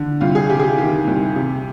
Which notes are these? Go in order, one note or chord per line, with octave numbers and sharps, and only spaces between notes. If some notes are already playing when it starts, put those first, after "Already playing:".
Already playing: D3
C2 F4
G#4
C3 G4
G#4
G4
D#3 G4
C2
C3